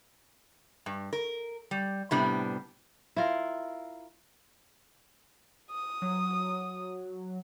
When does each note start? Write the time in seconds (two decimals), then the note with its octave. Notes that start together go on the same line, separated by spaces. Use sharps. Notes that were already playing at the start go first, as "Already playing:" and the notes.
0.86 G2
1.13 A#4
1.71 G3
2.11 A2 C3 G3 B3 D4
3.16 E4 F4 A#4
5.71 D#6
6.02 F#3